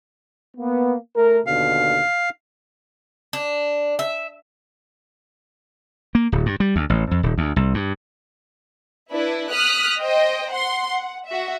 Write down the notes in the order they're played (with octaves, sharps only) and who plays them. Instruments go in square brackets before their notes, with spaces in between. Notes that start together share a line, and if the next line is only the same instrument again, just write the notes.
[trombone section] A#3 B3
A3 A#4
[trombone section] D#2 B2 D3 [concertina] F5
[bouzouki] D4
E5
[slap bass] A#3
D1
G2
G3
D2
A1
F2
D#1
D2
C2
G2
[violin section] D4 E4 B4
D#6 F6 F#6 B6
C5 D#5 G5
F#5 C6
F#5
F#4 E5